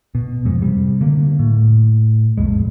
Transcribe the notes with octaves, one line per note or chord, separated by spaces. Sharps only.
B2
F2 G#2
C3 G3
D3 A#3
A2
B1 F2 G#3